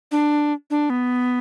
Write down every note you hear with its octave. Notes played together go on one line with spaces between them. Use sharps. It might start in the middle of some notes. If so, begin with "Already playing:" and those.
D4
D4
B3